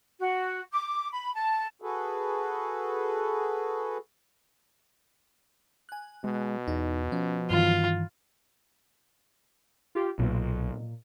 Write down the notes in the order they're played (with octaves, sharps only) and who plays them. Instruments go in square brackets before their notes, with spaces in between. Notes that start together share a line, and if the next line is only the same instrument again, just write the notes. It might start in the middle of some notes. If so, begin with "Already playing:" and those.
[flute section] F#4
D6
B5
A5
[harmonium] F#4 G#4 A4 B4
[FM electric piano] G#5 F#6
[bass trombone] B2 [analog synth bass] G#3
[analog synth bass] E2 [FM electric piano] D#4
[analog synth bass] F3 [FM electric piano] C#4
[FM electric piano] G2 D#3 E3 [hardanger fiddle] F4
[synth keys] F4 G4
[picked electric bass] B1 [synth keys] A#2